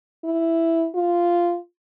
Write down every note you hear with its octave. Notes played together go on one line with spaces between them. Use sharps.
E4
F4